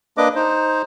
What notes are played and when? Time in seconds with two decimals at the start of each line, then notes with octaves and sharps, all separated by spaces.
0.17 A#3 D4 B4 D#5 D6
0.36 D#4 C5